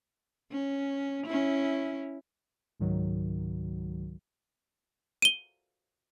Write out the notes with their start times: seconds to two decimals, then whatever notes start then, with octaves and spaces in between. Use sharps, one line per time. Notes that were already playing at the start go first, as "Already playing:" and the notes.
0.52 C#4
1.27 C#4 E4
2.80 C#2 G#2 D#3 F#3
5.22 D#7 G7